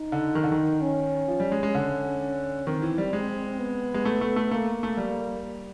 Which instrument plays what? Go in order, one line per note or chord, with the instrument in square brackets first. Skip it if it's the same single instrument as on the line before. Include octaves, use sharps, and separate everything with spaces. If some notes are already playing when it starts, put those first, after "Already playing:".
Already playing: [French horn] D#4
[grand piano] D3
D#3
D3
D#3
[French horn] C#4
[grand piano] F3
G3
G#3
G#3
D3
[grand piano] D#3 [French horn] C4
[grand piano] E3
G3
G#3
[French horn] B3
[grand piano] G#3
A3
A3
A3
[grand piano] A3 [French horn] A#3
[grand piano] A3
G3